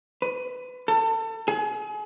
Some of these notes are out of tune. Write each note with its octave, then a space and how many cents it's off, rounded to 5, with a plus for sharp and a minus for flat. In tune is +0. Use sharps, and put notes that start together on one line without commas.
B4 +25
A4 +30
G#4 +35